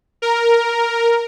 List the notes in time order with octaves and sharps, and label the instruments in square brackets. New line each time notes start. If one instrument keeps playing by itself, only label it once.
[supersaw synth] A#4